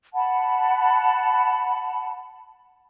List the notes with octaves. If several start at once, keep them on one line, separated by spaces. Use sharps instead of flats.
F#5 A5 B5